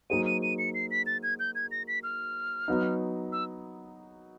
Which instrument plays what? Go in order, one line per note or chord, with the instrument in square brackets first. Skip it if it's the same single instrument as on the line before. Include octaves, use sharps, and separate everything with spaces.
[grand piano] F#3 A#3 D#4 G#4 C5 [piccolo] D#7
[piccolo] D#7
D#7
C#7
C7
B6
A6
G#6
G6
G#6
A#6
B6
F6
[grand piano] F#3 B3 D#4
[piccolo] E6